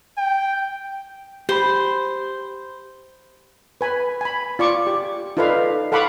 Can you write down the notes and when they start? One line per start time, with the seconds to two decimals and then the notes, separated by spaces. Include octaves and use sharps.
0.18 G5
1.49 G4 C5 B5
3.81 B4 G#5 B5
4.21 G#5 B5
4.59 F4 D5 C#6 D6
4.87 G4
5.37 D#4 F4 A4 B4 D5 F5
5.92 A4 F5 F#5 B5 C#6 D6